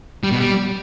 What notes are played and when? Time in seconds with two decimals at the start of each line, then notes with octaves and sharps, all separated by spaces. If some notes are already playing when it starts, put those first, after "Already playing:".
0.24 G3
0.32 B2
0.40 G3